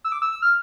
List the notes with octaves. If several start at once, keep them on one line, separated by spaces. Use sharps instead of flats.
E6
D6
E6
E6
F6